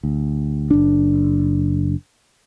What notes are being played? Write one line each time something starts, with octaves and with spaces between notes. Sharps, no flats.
D2
F#1 D4